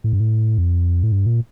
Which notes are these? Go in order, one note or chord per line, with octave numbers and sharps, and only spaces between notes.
A2
G2
A2
F2
A2
G2
A#2